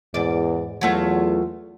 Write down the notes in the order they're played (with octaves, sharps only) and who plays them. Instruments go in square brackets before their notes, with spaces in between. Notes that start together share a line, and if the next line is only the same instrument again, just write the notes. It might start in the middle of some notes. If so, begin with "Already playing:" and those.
[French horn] E2 [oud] G#2 D5
[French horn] E2 [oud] F#3 A3 F4